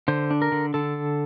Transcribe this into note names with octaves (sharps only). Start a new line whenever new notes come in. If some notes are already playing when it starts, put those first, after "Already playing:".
D3 C5
D4
A#4
D3
D3 A4